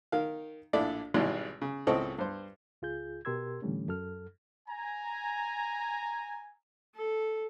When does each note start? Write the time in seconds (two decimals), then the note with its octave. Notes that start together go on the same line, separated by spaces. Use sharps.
0.12 D#3 F5
0.73 A#1 A2 D4 E4 A4 D5
1.14 G#1 G#2 B2 E3 G3 G#3
1.62 C#3
1.87 C#2 A2 C4 A4 D#5 C#6
2.18 G2 C5
2.82 C#2 F4 G#4 G6
3.25 B2 G4 A#4 C6 E6 G#6
3.62 A2 D3 E3 G3 A3 C#4
3.88 F#2 A4 F6
4.68 G#5 A#5
6.95 A4